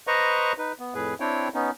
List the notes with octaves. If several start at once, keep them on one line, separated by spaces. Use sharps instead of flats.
B4 C5 D#5 A#5 C#6
D#4 B4
B3
F2 A2 G#4 B4
C4 D4 E4 C#5 G5
B3 C#4 D#4